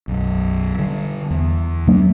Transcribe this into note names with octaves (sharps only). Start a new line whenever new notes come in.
B1 F#2
D3 G3
E2
F#3 A#3 D4